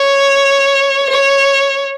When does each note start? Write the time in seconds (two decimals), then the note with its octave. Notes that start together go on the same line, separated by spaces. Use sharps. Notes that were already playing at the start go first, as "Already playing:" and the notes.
Already playing: C#5
1.10 C#5